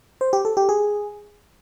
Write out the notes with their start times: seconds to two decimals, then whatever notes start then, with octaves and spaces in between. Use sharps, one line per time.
0.21 C5
0.33 G4
0.45 A4
0.57 G4
0.69 G#4